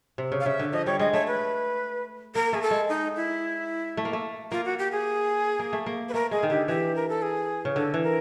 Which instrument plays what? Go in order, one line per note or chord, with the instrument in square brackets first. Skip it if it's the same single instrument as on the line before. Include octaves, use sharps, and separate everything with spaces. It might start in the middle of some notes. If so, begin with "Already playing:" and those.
[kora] C3
C#3
[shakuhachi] F5
[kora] C#3 [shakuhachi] E5
[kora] D3
[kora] F3 [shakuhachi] D#5
[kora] G3 [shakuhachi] C#5
[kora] G#3 [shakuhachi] D#5
[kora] A3 [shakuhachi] C#5
[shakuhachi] B4
[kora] A#3 [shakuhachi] A#4
[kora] A3 [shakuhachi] G#4
[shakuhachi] A4
[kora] G#3
[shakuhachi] D#4
E4
[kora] A3
A#3
A3
[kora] A#3 [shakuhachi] F4
[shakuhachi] F#4
G4
G#4
[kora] A#3
A3
A#3
[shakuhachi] B4
[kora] A3 [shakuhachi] A#4
[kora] G#3 [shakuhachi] G#4
[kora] D#3
[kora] D3 [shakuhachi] G4
[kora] E3 [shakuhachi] G4
[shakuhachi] A#4
A4
G#4
[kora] C#3
[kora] D3 [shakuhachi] A4
[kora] E3
[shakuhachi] A#4